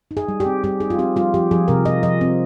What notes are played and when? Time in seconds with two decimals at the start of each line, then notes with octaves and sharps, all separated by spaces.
0.11 D#4
0.17 G#4
0.28 G3
0.40 G4
0.46 C4
0.64 G3 G4
0.80 D#4 G#4
0.90 F4
0.99 C4 G4
1.16 G3 F4
1.34 F3 G4
1.51 F3 G#4
1.68 C3 A#4
1.85 F4 D#5
2.03 F3 D#5
2.21 C4